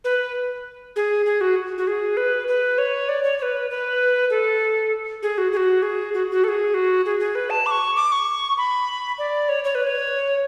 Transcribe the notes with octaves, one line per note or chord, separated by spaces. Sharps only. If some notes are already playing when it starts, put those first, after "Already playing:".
B4
G#4
G#4
F#4
F#4
G#4
B4
B4
C#5
D5
C#5
C#5
B4
B4
A4
G#4
F#4
G#4
F#4
G#4
F#4
F#4
A4
G#4
F#4
G#4
G#4
B4
A5
D6
C#6
D6
C#6
B5
D5
C#5
C#5
B4
C#5